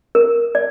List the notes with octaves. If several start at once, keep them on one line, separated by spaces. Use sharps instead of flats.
A#4
D5